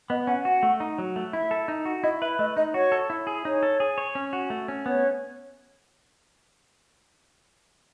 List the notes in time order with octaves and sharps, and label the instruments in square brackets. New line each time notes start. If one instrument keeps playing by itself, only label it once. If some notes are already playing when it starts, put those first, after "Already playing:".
[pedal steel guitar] B3 [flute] D#5
[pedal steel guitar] C#4 [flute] F#5
[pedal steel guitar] F#4 [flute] F#5
[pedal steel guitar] A3
D#4
F#3
A3
[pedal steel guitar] E4 [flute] E5
[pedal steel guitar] A4
D#4
F#4
[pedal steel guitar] E4 [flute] D#5
[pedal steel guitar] B4 [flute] E5
[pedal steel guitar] A3 [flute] D#5
[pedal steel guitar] D#4 [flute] D#5
[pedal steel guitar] F#4 [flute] C#5
[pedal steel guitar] A4
E4
G#4
[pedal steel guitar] D#4 [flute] C#5
[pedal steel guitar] A4
G#4
C#5
C#4
F#4
A3
C#4
[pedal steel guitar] B3 [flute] C#5